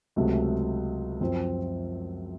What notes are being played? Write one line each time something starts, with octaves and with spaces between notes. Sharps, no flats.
C#2 C3 F#3 A3
F#2 F3 C4